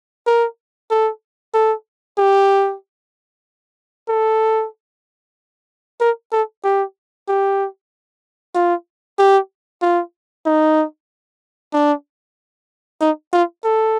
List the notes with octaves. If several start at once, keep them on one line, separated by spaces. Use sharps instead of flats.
A#4
A4
A4
G4
A4
A#4
A4
G4
G4
F4
G4
F4
D#4
D4
D#4
F4
A4